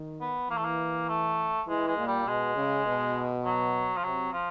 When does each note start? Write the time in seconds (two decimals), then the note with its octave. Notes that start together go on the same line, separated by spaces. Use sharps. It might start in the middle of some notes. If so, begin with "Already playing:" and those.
Already playing: D#3
0.21 B3
0.50 E3 A#3
0.57 A3
0.64 A#3
1.08 A3
1.68 E3 G#3
1.87 G#3
1.97 A#2
2.07 G3
2.26 B2 G#3
2.56 C#3
2.86 B2
3.44 F#3
3.97 F3
4.03 C3 F#3
4.33 F3